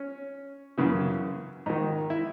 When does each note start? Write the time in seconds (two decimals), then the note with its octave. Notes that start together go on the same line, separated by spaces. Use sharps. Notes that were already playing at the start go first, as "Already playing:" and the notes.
Already playing: C#4
0.78 F#2 C#3 E3
1.66 G#2 D#3 D#4
2.10 E4